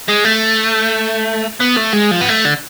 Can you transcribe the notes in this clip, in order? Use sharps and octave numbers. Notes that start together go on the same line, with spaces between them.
G#3
A3
B3
A3
G#3
F3
B3
A3
D3